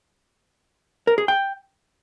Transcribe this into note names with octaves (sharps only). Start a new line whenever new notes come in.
A#4
G#4
G5